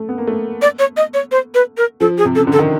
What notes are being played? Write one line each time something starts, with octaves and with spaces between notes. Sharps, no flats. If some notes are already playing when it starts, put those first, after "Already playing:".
Already playing: A3
B3
A#3
A3
D5
C#5
D#5
C#5
C5
B4
A#4
F3 A4
G#4
C3
C#3 A4
D3
A4
D#3